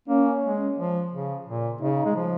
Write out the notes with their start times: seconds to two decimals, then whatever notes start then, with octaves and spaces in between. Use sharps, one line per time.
0.08 A#3 C#4
0.43 G#3
0.78 F3
1.12 C#3
1.46 A#2
1.82 C#3 D#4
2.06 G#3
2.16 F3